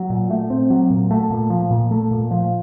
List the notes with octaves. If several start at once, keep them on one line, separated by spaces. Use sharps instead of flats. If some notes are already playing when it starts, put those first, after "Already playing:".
Already playing: F#3
A#2
A3
C4
F#3
A#2
A3
A#2
F3
A#2
A3
A#2
F3